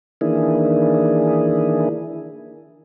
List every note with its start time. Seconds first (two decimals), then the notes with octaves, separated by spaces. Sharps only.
0.21 D#3 E3 A#3 D4 E4 G#4